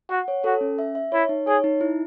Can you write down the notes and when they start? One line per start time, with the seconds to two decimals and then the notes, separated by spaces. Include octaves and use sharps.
0.10 F#4 F#5
0.28 C#5
0.44 F#4 A4
0.61 C#4
0.79 E5
0.95 E5
1.12 E4 C#5
1.29 D#4
1.47 G#4 C#5
1.64 D#4
1.81 E4